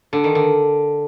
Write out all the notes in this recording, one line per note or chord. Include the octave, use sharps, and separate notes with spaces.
D3
D#3
D3